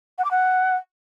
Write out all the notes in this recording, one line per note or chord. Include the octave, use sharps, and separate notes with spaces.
F#5
D6
F#5